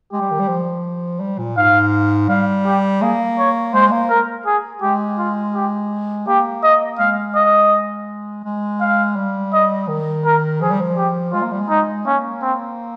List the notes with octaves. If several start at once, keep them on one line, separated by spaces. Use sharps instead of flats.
G#3 G4
G3
D#3
G3
F3
G3
A#2
G#2 F5
G3 F5
G4
A#3 G#4
C#5
G#3 C5
A#3
A#4
G#4
G#3 G4
F4
G4
A#3 G4
D#5
G#3 F5
D#5
G#3
F5
G3
D#5
D#3
A#4
F3 G#4
G3
F3
G4
G#3 F4
A#3
G3
G#3
D#4
A#3 C#4
C4